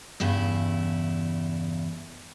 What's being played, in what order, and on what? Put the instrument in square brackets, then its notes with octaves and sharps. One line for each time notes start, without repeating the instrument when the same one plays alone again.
[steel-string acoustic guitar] E2 G2 C#3 E4